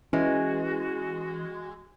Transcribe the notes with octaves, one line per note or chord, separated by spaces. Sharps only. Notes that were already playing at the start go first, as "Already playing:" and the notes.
E3 G#3 C#4 F#4